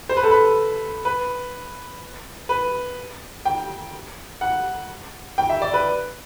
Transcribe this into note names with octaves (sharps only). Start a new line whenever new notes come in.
C5
B4
A4
B4
B4
B4
G5
F#5
G5
E5
D5
B4